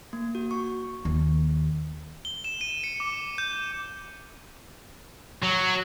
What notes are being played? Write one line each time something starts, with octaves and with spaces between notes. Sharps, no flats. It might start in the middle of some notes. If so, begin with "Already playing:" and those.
A#3
F#4
C#6
D#2
G7
E7
D#7
C#7
D6
G6
F#3